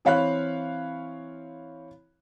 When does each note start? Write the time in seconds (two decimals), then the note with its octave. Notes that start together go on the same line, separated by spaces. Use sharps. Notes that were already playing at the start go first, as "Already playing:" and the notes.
0.05 E3 C4 C#5 F5 B5 F#6